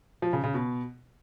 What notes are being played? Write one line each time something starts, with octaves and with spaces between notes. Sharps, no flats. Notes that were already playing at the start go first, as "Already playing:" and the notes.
F3
C#3
C#3
B2